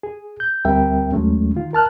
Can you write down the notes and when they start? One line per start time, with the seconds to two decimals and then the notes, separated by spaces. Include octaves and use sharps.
0.03 G#4
0.40 G6
0.65 D2 G3 C4 A#4 E5 G5
1.12 D#2 F#3 G#3 A3 C#4
1.56 D#3 F4
1.73 A#4 A5 F6 F#6